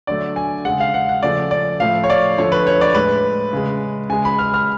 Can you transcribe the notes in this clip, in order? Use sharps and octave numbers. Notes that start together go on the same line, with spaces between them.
D3 F#3 A3 D5
G#5
C#3 G#3 F#5
F5
F#5
F#5
C#3 F3 A3 D5
D5
A2 F3 A3 F5
C#5
D5
D3 F3 A3 C#5
B4
C#5
D5
A2 G#3 B4
C#3 G#3
C#3 G#3 G#5
B5
F6
F6